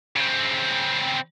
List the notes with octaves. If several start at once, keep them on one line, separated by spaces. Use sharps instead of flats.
C#3 C4